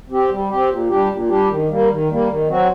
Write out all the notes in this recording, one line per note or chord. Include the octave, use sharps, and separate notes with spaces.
C4 G4
G3
C4 G4
A#2
G3 D4 G4
A#2
G3 D4 G4
D#3
G3 A#3
D#3
G3 A#3
D#3
F#3 C4 F#4